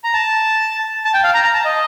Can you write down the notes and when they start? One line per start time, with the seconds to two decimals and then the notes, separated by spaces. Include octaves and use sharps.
0.04 A#5
0.14 A5
1.05 A5
1.14 G5
1.24 F5
1.34 A#5
1.44 A#5
1.54 A5
1.65 D#5